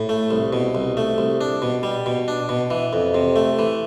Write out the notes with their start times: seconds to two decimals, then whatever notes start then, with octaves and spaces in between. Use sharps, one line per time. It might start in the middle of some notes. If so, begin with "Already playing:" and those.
Already playing: A2
0.09 A3
0.31 C2
0.53 B2
0.75 C2
0.97 A3
1.18 C2
1.41 D4
1.62 B2
1.83 G3
2.06 B2
2.28 D4
2.49 B2
2.70 E3
2.93 F2
3.14 C3
3.36 A3
3.59 E3